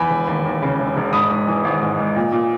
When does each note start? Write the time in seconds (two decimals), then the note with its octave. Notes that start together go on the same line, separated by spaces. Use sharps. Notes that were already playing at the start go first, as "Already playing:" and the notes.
Already playing: E2 G#5 B5
0.10 E1
0.27 D#2
0.45 D#2
0.62 C#3
0.80 E1
0.96 E1
1.13 G#2 B5 D#6
1.30 G#2
1.47 E3
1.64 G#1
1.82 G#2
1.99 G#2
2.16 A#2
2.32 A#2